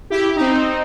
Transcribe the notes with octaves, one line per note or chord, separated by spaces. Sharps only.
E4 G4
C4 D#4